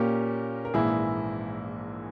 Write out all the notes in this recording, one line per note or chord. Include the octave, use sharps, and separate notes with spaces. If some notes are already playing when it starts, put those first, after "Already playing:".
Already playing: A#2 A#3 C#4 G4 A#4
A#4
A#1 G#2 E3 A#3 E4 G#4